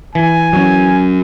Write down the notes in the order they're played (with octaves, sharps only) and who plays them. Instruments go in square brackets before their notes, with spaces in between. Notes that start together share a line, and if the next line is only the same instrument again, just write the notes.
[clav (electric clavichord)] E3 [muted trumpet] G#5
[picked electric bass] F#3 C#4